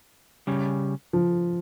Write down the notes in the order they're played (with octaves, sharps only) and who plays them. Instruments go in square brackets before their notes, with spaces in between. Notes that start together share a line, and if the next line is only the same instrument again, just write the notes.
[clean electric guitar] C#3 G3 C#4
[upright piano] F3